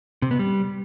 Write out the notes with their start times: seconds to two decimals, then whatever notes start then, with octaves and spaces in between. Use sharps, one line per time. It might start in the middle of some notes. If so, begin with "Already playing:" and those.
0.22 C3
0.31 B3
0.39 G3